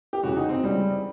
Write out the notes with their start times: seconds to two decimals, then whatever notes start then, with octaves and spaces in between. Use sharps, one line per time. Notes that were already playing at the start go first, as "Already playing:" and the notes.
0.13 G4
0.23 E1 E2 C#3 E3 F#4
0.36 D#4
0.49 C4
0.62 C#2 C#3 E3 G3